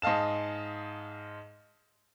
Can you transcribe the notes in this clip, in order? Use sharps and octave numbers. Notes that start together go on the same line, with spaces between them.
G#2 D#5 F5 A5 E7